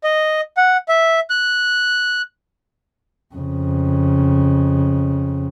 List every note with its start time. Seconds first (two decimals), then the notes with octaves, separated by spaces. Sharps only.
0.04 D#5
0.57 F#5
0.89 E5
1.30 F#6
3.35 F2 C#3